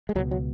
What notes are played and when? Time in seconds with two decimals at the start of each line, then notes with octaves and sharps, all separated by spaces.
0.09 G#3
0.15 C#2 F#3
0.19 B2
0.31 F#3